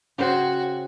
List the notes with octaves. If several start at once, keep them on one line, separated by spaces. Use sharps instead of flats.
C#3 F#4 C5 G5